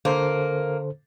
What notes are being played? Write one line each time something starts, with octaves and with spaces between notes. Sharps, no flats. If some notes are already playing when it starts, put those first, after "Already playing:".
D3 A#3 A4 C5